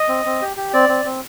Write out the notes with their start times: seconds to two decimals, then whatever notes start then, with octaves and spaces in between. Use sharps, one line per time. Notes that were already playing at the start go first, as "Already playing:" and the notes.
Already playing: D#5
0.09 C4
0.25 C4
0.42 G4
0.57 G4
0.73 C4 D5
0.89 C4
1.05 C4